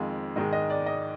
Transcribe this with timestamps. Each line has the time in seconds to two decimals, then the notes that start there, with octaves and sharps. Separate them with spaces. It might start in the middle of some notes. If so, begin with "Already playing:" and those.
Already playing: F2 D#3 G#3 C4 F5
0.36 G#2 D#3 G#3 D#5
0.53 D#5
0.70 D5
0.86 D#5